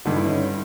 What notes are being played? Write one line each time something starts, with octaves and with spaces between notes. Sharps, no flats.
G2 D3 D#4
E4
C#4 D#4